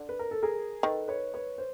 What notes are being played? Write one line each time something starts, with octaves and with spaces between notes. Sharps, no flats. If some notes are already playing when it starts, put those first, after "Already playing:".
Already playing: D3
B4
A#4
A4
G#4 A#4
D#3 A4 B4
B4 C#5
B4 C#5
C5